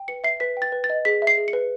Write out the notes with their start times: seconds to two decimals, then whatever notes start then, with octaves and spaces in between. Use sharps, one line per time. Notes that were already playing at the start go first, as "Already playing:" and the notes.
Already playing: G5
0.08 B4 C#7
0.24 E5 C7
0.40 B4 B6
0.57 G5
0.62 A6
0.72 B4
0.84 A6
0.90 D#5
1.05 G#4 B6
1.22 E5
1.27 C7
1.37 G#4
1.48 C#7
1.53 B4